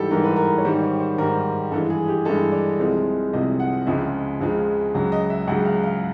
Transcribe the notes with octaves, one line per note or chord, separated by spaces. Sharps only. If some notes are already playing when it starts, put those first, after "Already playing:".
Already playing: G#2 E3 G3 G4 A4
G#2 E3 G3 A#4
B4
A#4
C#5
G#2 D#3 G3 C5
C#5
C5
G#2 D#3 G3 A#4
G2 E3 G#3 A4
G#4
G4
G2 E3 G#3 A4
D5
C2 C3 F3 G#3
C2 C3 F3 G#3 D#5
F#5
C#2 C#3 F3 G#3 E5
C#2 C#3 F3 G#3
C#2 C#3 F#3
D#5
E5
C#2 C#3 F#3 F#5
F5
F5